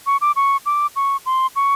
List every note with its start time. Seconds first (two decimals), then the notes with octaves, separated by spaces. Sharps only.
0.06 C#6
0.21 D6
0.36 C#6
0.66 D6
0.96 C#6
1.26 C6
1.56 C#6